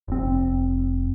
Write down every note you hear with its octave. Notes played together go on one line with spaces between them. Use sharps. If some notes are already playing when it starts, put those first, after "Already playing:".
F1 C4